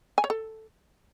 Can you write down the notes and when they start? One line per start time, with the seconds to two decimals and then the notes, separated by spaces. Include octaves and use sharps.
0.18 G#5
0.24 C#5
0.30 A4